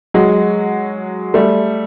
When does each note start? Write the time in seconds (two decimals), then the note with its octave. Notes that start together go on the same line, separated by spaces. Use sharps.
0.14 F#3 G#3
1.34 G3 A3